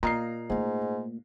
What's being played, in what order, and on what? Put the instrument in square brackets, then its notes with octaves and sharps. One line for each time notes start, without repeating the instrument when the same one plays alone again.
[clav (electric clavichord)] A#2 D#5 F5 [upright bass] A#3 [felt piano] A#5 C7
[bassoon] G#2 [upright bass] A3 A#3